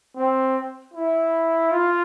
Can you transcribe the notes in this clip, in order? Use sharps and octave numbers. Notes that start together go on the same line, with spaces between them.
C4
E4
F4